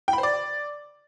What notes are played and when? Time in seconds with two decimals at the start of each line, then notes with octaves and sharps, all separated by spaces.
0.08 G5
0.13 B5
0.18 C5
0.23 D5